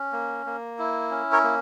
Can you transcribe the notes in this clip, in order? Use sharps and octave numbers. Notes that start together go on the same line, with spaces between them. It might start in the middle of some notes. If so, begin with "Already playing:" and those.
Already playing: C#4
A#3
A#3
E4
C#4
A#4 C#5
A#3